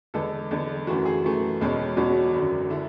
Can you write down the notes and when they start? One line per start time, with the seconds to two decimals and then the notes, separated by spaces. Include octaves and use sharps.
0.14 E2 D3 G#3 B3 A4
0.51 E2 D3 G#3 B3
0.87 F#2 E3 A3 F#4
1.05 G#4
1.23 F#2 E3 A3
1.61 E1 E2 B2 G#3 C#4
1.97 E1 E2 B2 G#3 C#4 F#4
2.34 G#1 F#2 D3
2.70 D3 E4